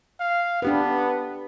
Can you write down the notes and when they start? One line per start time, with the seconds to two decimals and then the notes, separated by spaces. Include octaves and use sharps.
0.20 F5
0.62 B3 D4 G4 B4